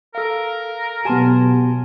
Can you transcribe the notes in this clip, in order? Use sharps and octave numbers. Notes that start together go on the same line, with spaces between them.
A4 A#4 F5
B2 F#3 B3 G4 G#5 A5 C6